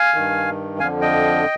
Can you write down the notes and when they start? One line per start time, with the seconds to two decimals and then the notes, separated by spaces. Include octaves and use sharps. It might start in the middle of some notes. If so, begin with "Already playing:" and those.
Already playing: F5 G#5
0.14 G2 D#3
0.80 F2 D3 F3 F5 G#5
1.01 D#5 G5